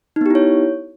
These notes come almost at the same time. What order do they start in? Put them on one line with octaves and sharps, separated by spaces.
D#4 B3 G4 E4 C#5